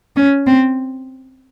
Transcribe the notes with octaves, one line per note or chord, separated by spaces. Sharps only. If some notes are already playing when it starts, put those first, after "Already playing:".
C#4
C4